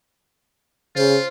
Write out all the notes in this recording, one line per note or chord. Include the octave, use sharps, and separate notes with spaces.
C#3 F4 C5